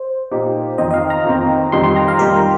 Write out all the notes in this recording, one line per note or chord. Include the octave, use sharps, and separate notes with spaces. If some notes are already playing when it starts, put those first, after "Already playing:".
Already playing: C5
A#2 A#3 D#4 G4
F2 D#3 C4 D#5
D#5
F5
A#5
F2 D#3 C4
F2 D#3 G3 D#4 G4 C6
C6
A#5
F5
F2 D#3 G3 D#4 G4 A#4